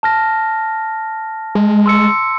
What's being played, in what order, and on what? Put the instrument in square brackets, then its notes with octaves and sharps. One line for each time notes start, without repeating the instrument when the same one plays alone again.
[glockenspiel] A5 F6 A#6
[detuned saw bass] G#3
[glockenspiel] C6 E6 C#7